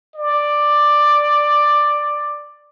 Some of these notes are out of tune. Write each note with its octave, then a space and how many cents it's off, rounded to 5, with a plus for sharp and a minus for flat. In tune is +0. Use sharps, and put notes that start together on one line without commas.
D5 +10